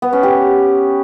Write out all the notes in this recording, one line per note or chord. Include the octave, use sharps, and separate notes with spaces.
B3
C#4
G4